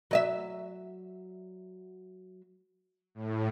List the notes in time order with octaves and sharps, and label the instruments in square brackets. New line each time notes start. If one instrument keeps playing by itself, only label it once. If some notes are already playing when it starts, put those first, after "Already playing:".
[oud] F#3 D#5 E5
[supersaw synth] A2